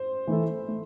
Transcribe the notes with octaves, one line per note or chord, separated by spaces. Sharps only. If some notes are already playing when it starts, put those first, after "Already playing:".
Already playing: C5
E3 A3 E4 A4
A3